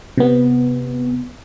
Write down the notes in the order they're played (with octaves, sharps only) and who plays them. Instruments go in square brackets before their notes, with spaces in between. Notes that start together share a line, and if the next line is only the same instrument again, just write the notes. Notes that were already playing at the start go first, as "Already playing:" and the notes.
[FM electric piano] C3 B3